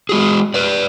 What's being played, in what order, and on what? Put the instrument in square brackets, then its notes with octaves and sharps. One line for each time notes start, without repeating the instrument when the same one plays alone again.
[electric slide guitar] G#3 F#4 G#4
B4 D5